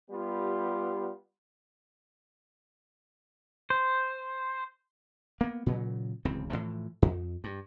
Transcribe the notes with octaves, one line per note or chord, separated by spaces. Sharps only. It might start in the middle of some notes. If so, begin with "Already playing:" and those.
G3 B3 F4 G4
C5
A#3 B3
A#2 C#3 E3 F#3
D1 C#2 E3 C4
A2 C3 E3 F3
F2
G2